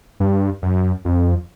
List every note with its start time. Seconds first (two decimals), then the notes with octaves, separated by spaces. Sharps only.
0.20 G2
0.62 F#2
1.05 F2